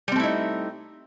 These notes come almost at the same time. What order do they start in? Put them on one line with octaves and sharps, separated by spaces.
G3 C4 A3 E4 D#4